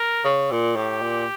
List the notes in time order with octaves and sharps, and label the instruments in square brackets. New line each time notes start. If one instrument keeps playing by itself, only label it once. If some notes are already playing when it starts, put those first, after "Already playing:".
Already playing: [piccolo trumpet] A#4
[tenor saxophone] C#3
A#2
[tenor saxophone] A2 [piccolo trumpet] G4
[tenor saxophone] A#2